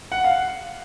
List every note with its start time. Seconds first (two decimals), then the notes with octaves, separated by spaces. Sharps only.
0.12 F#5
0.24 F5